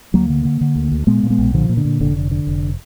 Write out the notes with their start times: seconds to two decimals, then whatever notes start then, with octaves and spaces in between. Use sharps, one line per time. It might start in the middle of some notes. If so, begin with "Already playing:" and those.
0.14 D2 F#3 A#3
0.30 D3
0.45 D3
0.61 D3
0.76 D2
0.92 D2
1.07 A#2 G#3 B3
1.23 A#2
1.30 G#3 B3
1.38 B1
1.54 A#2 D3 F3
1.69 A#2
1.77 D3
1.85 A#2
2.00 F1 D3
2.16 D3
2.31 D3
2.47 F1